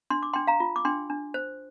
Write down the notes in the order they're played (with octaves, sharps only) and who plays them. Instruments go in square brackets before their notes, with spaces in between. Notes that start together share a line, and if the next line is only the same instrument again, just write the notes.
[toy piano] D4 C6
D6
D4 G5 C6
F5 A#5
F4
D6
D4 G5 C6
D4
C5